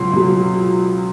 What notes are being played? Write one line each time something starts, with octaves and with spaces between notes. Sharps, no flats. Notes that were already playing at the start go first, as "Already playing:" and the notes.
Already playing: C#2 B2 F#3 C6
C#2 B2 F#3